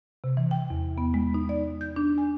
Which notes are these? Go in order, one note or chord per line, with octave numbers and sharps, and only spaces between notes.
C3
E3
G5
E2
B3
G#3
D#4
D5
G6
D4
G#5